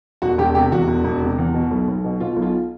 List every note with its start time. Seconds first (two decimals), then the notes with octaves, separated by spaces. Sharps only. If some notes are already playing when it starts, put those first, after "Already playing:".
0.22 E1 F#4
0.38 E1 G4
0.55 C3 G4
0.71 E2 F#4
0.88 E1
1.05 E1
1.21 C3
1.38 E2
1.54 B2
1.71 B1
1.88 B1
2.04 B2
2.20 B2 F4
2.36 B1
2.42 F4